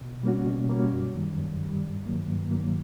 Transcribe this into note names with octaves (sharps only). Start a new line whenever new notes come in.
B2
G3 A#3 C#4 F#4
B2
G3 A#3 C#4 F#4
F#2
D#3 G3
F#2
D#3 G3
G2
D#3 F#3 A#3
G2
D#3 F#3 A#3